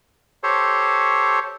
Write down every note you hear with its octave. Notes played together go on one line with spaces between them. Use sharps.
G4 A4 C5 C#5